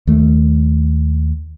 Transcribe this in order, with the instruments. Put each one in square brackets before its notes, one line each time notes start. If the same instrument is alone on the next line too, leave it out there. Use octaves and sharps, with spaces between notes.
[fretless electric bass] D#2 A3